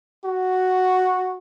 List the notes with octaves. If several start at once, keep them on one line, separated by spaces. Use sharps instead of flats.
F#4